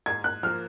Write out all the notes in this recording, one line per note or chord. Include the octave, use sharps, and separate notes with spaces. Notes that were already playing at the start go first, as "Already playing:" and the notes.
G#2 G#6
F#6
F3 A#3 F6